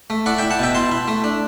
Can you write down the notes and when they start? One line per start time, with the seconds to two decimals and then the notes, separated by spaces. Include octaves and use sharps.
0.10 A3
0.26 E4 D5 F#5
0.38 E4 E5 G5
0.51 F#5 A5
0.59 B2 E5 G5
0.75 E4 A5 C6
0.91 E4
1.08 A3
1.24 D4